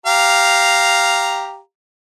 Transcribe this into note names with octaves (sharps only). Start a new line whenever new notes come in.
G4 F5 A#5